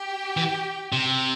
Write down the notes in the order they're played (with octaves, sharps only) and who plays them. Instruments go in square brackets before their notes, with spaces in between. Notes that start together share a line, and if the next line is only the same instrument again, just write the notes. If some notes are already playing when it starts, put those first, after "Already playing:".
Already playing: [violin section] G4 G5
[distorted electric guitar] E3
C3